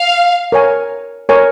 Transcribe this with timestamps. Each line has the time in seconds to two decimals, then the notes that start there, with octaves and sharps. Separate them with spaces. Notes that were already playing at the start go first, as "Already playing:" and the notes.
Already playing: F5
0.52 A#4 C#5 G#5
1.29 A#4 C#5 G#5